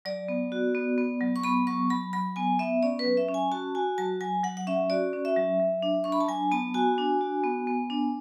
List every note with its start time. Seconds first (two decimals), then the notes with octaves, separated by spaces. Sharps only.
0.05 F#3 D5
0.28 B3
0.52 F#4
0.75 B3
0.98 B3
1.21 F#3
1.36 C#6
1.44 B3 B5
1.67 F#3 C#6
1.90 F#3 B5
2.13 F#3 B5
2.36 B3 G#5
2.59 B3 E5
2.83 C#4 D5
2.99 B4
3.05 F#3
3.17 E5
3.28 C#4
3.34 G#5
3.51 F#4 A5
3.75 F#4 G#5
3.98 F#3 A5
4.21 F#3 G#5
4.44 F#3 F#5
4.57 F#5
4.67 C#4 E5
4.90 F#4 D5
5.13 C#4
5.25 E5
5.37 F#3
5.59 F#3
5.82 D4
6.04 D4 C#6
6.12 B5
6.21 A5
6.28 F#3 G#5
6.51 B3 A5
6.74 F#4 G#5
6.98 D4
7.21 F#4
7.44 B3
7.67 B3
7.90 D4